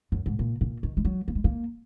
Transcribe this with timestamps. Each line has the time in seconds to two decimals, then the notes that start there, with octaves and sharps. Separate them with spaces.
0.12 F#2
0.26 G#2
0.39 A#2
0.61 A#2
0.83 D#3
0.97 G#3
1.05 F#3
1.28 A#3
1.35 G#3
1.44 A#3